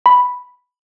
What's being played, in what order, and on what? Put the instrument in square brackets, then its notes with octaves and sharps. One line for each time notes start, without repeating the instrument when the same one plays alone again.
[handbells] B5